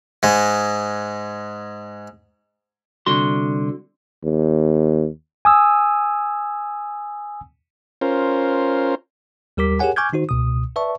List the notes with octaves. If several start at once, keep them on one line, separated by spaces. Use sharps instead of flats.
G#2 G#3
C2 D3 F#4 C6
D#2
G#5 D#6 E6
C#4 F4 A#4 C5
D#2 G3 G4 A#4 D6 B6
G4 G#4 A#4 C#5 F#5 G#5
G#5 C#6 D6 F6 G6 G#6
D#3 D#4 F#4 C5
C#2 B2 D#6
B4 D5 E5 A5 C#6